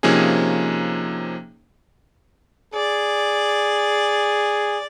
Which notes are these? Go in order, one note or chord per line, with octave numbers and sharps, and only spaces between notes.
C3 F3 A#3 C#4 D#4 G#4
G#4 D5